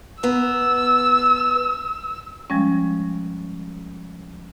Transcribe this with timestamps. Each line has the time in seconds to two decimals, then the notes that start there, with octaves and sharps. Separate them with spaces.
0.23 B3 A#5 E6
2.50 F3 G3 G#3 C#4